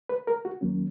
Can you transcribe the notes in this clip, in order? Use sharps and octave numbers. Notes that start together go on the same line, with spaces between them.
B4
A#4
F#4
D#2 D#3 F#3 A#3 C#4